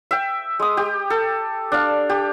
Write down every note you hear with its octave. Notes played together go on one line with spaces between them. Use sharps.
E5 G5
G#3 D#6
G4
A4
D4 D5 F5
G4